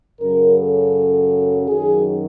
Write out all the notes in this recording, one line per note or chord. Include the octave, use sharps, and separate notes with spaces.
F#2 C#3 F#3 A#4
A4
F#2 D#3 F#3 G#4